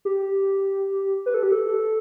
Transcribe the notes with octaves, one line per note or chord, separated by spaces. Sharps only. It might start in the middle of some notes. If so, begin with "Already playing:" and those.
G4
B4
A4
G4
A4